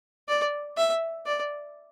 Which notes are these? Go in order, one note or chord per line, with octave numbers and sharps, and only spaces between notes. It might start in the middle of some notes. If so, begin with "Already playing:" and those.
D5
E5
D5